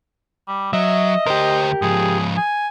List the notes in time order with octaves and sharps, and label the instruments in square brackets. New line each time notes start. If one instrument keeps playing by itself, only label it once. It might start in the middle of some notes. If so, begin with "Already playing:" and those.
[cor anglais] G3
[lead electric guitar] F#3 [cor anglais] D#5 [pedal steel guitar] E5
[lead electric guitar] D2 C5 [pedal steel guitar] G4 A#4
[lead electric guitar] G#2 F3 [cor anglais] G#4
[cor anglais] G#5